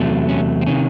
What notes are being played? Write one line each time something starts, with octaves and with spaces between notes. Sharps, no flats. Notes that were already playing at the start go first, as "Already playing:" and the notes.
Already playing: E2 C3 F#3 A3
C#4
C4
C3 D#3 C#4